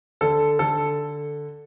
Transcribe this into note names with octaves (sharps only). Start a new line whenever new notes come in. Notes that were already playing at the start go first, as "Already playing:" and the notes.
D3 A4
D3 A4